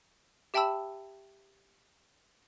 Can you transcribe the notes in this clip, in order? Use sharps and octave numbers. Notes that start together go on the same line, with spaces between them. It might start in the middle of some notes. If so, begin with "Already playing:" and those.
G4 E5 G5 A5 B5 E6